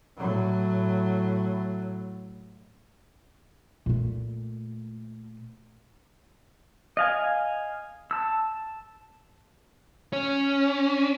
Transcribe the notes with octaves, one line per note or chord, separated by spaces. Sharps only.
A2 F#3
A#2 A3
D#5 F5 G#5
A5 E6
C#4